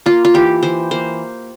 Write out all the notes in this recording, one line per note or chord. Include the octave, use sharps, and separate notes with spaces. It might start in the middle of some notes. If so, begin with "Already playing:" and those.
A#3 F4
F4
E3 G4
E3 C5
A#3 C5